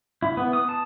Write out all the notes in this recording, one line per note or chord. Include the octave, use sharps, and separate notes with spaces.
E4
B3
D#6
A5